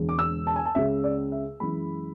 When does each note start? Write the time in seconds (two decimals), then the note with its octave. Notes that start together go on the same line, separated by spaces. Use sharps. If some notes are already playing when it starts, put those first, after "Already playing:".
Already playing: E1 E2 D3 G#3
0.09 D6
0.19 E6
0.47 A5
0.56 G#5
0.65 A5
0.75 C#2 C#3 G#3 E5
1.04 D5
1.32 E5
1.60 F#2 E3 G#3 B5